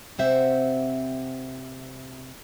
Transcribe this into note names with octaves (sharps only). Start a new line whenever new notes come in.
C3 C4 C5 E5 F#5